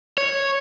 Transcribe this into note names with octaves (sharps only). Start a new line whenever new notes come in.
C#5